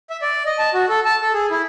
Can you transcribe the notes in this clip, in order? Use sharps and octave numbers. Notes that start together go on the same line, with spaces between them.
E5
D5
D#5
A5
F#4
A4
A5
A4
G#4
E4